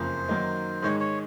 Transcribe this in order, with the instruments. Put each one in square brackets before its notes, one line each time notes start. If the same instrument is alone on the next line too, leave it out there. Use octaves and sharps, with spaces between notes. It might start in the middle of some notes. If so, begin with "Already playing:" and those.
Already playing: [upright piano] F#1 F2 C#3 F3 A#3 [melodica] C5
[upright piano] F#2 D#3 F#3 A#3 D#4
[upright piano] G#2 D#3 G#3 [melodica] C#5
[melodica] C#5